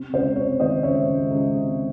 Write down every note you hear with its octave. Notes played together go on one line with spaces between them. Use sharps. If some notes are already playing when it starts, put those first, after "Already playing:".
Already playing: C3
C#2 C5
C3 C#5
D#3 C5 D#5
C#2 C#5 E5
C#2
C#2
C3